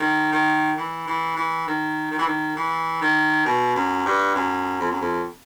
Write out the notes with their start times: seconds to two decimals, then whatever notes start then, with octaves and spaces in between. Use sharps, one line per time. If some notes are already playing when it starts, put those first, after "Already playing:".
Already playing: D#3
0.32 D#3
0.77 E3
1.07 E3
1.36 E3
1.67 D#3
2.11 D#3
2.18 E3
2.26 D#3
2.56 E3
3.01 D#3
3.45 B2
3.75 F#2
4.06 G2
4.35 F#2
4.80 F2
4.90 F#2
5.00 F2